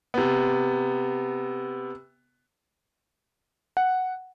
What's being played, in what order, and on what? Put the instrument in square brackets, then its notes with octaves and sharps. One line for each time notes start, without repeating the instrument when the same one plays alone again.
[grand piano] C3 B3
[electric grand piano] F#5